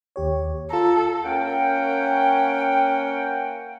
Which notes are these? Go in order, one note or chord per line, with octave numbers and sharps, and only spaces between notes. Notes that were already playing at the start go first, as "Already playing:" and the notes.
D#2 G4 C#5
F4 A4 A#5
A#3 C#4 A#4 F#5 G5